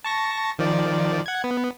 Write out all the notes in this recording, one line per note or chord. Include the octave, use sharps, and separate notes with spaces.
A5 C#6 A#6
D#3 F3 D5
F#5 G#6
B3